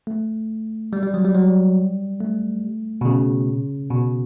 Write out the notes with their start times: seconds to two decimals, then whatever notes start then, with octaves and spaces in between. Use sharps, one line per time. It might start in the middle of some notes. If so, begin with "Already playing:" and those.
0.07 A3
0.93 G3
1.03 G3
1.14 F#3
1.25 G3
1.35 F#3
1.45 G3
2.20 A3
3.01 B2
3.05 C#3
3.91 B2